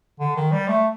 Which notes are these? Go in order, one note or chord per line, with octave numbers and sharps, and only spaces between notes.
D3
D#3
G3
A3